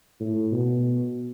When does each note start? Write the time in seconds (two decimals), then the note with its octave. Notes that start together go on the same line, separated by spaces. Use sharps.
0.20 A2
0.52 B2